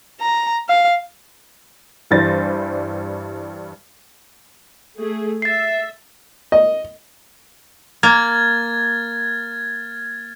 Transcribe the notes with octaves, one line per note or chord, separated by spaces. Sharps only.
A#5
F5
G2 E3 G3 C5 A6 A#6
A3 G#4
E5 A6 C7
D#5
A#3 F6 G#6 A6